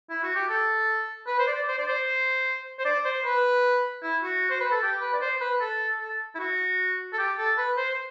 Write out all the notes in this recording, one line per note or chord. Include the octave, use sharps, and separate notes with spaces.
E4
F#4
G4
A4
B4
C5
D5
C5
D5
C5
C5
D5
C5
B4
E4
F#4
C5
B4
A4
G4
B4
D5
C5
B4
A4
A4
E4
F#4
A4
G4
A4
B4
C5